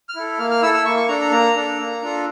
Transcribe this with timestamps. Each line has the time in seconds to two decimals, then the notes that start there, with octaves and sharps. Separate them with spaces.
0.09 F6
0.15 E4 A4
0.39 A#3 F6
0.51 F6
0.62 E4 E6
0.65 A4
0.74 E6
0.85 A#3 C#6
0.97 C#6
1.08 D4 A4 A#5
1.21 A#5
1.32 A#3 A#5
1.56 D4 A4
1.79 A#3
2.02 D4 F4 A4